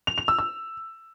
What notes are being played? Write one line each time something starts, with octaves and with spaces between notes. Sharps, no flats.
F7
F7
E6
E6